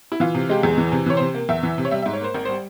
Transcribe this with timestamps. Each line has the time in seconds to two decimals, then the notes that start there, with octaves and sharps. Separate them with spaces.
0.12 E4
0.20 E3 F4
0.34 C3
0.50 G#3 G4
0.63 E2 G#4
0.78 E3
0.92 C3
1.06 E3 C#5
1.17 C3 C5
1.35 A#3
1.49 E2 E5
1.63 E3
1.78 C3
1.85 C#5
1.91 G3 E5
2.02 G#2 E5
2.13 C#5
2.21 A#3 C5
2.34 G#1 A#4
2.45 G3 C5